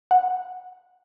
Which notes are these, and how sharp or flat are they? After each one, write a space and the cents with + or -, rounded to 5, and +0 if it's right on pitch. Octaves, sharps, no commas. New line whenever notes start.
F#5 -15